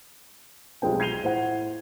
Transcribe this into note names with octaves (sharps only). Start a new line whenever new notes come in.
B1 F3 G3 G#3 C4 G5
G#6 C7 D#7 F7 G7
A2 C5 F#5